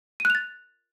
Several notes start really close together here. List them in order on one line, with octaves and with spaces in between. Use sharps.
D#7 F#6 F7 A6